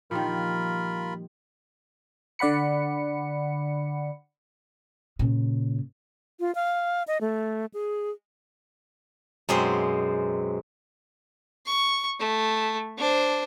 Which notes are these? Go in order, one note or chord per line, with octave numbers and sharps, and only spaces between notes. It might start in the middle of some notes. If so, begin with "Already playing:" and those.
A#2 D#3 F3 G3 F4 G4 A#4 B5
D3 D5 F#5 B5 C#7
A#2 C#3
F4
F5
D#5
A3
G#4
F#2 B2 G#3 C4 C5
C#6
A3
D4 C5